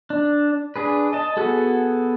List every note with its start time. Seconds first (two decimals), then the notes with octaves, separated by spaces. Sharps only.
0.10 D4
0.76 D4 G#4 B4
1.13 D#5 A5
1.37 B3 F#4 G#4 A4